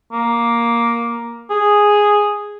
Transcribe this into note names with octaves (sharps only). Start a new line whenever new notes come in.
A#3
G#4